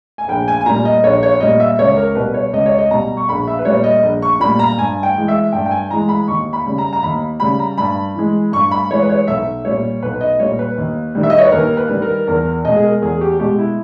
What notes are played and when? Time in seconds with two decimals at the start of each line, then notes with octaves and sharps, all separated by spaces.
0.18 G#5
0.28 A#1 G5
0.48 G#5
0.61 G#5
0.66 A#2 G3 A#5
0.85 D#5
1.04 A#1 C#5
1.23 C#5
1.40 A#2 G3 D#5
1.60 E5
1.79 C#2 C#5
1.97 A#4
2.15 B2 G3 B4
2.34 C#5
2.53 C#2 D#5
2.66 C#5
2.78 D#5
2.91 B2 G3 A#5
3.17 C#6
3.29 A#1 B5
3.47 E5
3.59 B4
3.65 A#2 G3 C#5
3.84 D#5
4.03 A#1
4.22 C#6
4.40 A#2 G3 B5
4.59 A#5
4.78 G2 G#5
5.03 G5
5.16 E3 G#3
5.28 E5
5.52 G2 G5
5.66 G5
5.71 G#5
5.90 E3 G#3 A#5
6.09 B5
6.28 D#2 C#6
6.53 B5
6.66 C#3 G3
6.78 A#5
6.93 A#5
7.03 D#2 B5
7.40 C#3 G3 B5
7.59 A#5
7.78 G2 B5
8.15 E3 G#3
8.52 G2 C#6
8.71 B5
8.90 E3 G#3 C#5
9.02 B4
9.09 C#5
9.27 B1 E5
9.65 A#2 G3 C#5
10.03 B1 B4
10.21 D#5
10.39 A#2 G3 C#5
10.59 B4
10.78 D#2
11.15 D#3 G3
11.23 E5
11.30 D#5
11.38 C#5
11.45 B4
11.52 D#2 A#4
11.77 B4
11.89 D#3 G3
12.02 A#4
12.27 E2 A#4
12.64 B2 G#3 D#5
12.76 G#4
12.84 A#4
13.02 E2 G#4
13.21 G4
13.39 B2 G#3 G4
13.58 E4